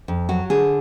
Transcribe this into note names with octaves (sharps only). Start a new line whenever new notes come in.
F2
F#3 F#4
D3 G#4